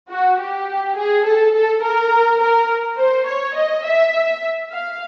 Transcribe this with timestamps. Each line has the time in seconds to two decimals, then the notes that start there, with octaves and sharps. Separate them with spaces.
0.10 F#4
0.39 G4
0.97 G#4
1.25 A4
1.54 A4
1.83 A#4
2.40 A#4
2.98 C5
3.27 C#5
3.56 D#5
3.85 E5
4.72 F5